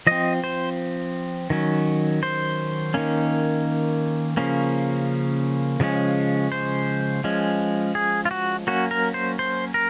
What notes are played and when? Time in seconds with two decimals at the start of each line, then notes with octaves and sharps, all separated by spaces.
0.07 F3 C4 D#5
0.44 C5
1.50 D#3 F#3 C#4
2.23 C5
2.94 D#3 A#3 C#4
4.37 C#3 F3 A#3 C#4
5.80 C#3 F3 G#3 C#4
6.52 C5
7.24 F3 G#3 C#4
7.95 G#4
8.25 F4
8.31 F#4
8.67 F#3 A#3 C#4 F#4
8.91 A#4
9.14 C5
9.39 C5
9.74 A#4